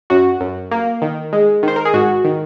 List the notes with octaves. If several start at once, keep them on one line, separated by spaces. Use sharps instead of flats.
F#2 F#4
F#2
A#3
D#3
G#3
D#3 C5
A#4
G#4
G#2 F#4
D#3